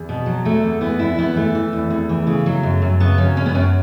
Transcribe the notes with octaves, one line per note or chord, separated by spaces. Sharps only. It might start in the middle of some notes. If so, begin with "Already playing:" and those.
Already playing: E2
B2
F#3
E2 A3
E2
E3 B3
E2 E4
E2 B3
E3 A3
E3
E2
E2
E3
C#3
F#3
F#2
F#2
C#3 B3
F#3 C#4
F#2 C#4
B3
F#2 C#4